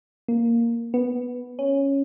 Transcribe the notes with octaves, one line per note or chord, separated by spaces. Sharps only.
A#3
B3
C#4